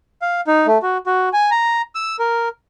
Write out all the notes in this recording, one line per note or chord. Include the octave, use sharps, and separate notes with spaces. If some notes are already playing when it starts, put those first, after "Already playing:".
F5
D#4
A3
F#4
F#4
G#5
A#5
E6
A#4